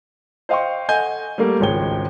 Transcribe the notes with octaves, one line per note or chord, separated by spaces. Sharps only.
C5 D#5 F5 G5 C6 C#6
A4 D#5 F#5 G#5 G6
G3 A3 A#3
G#1 C#2 G#3 C#5 G5 G7